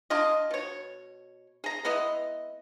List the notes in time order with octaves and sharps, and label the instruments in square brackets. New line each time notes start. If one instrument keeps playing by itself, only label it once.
[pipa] D4 F4 G#4 D#5
B2 C#5
G#4 A#5
G#3 B3 E4 D#5